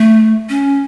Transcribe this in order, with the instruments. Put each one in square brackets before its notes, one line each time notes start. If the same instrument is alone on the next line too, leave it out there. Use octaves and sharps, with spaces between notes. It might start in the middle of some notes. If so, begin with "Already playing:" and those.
Already playing: [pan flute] A3
C#4